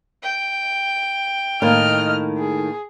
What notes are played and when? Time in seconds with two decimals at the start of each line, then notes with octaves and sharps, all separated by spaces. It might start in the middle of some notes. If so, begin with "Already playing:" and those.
0.22 G5
1.62 A2 D#3 A#3 D#5 F6
2.38 G#4